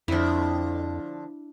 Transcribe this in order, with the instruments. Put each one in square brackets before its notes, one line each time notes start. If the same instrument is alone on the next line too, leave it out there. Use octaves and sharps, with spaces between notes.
[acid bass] F2 [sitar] D3 F3 [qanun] D4 E4